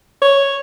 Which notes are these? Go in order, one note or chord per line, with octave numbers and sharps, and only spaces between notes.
C#5